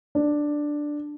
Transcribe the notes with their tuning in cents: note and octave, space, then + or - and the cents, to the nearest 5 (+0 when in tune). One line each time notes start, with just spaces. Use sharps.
D4 +5